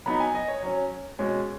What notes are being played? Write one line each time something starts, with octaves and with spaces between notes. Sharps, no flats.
F#3 B3 D#4 B5
G#5
D#5
C#5
F#3 C#4
B2 G#3 C#4